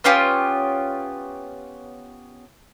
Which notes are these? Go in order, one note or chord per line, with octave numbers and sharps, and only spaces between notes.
B3 C#4 F4 G4